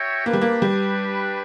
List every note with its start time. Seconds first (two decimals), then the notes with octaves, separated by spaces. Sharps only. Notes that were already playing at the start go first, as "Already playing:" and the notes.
Already playing: F#4 C#5 E5 G5
0.25 A#3 D4 G4 B4
0.33 G3
0.41 A#3
0.62 G3